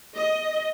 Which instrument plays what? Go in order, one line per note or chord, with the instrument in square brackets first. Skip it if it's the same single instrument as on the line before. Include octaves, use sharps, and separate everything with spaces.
[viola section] D#5